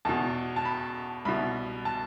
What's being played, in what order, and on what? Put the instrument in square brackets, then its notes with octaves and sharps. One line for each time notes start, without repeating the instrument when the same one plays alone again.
[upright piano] E2 B2 A5
A5
B5
C2 B2 B5
A5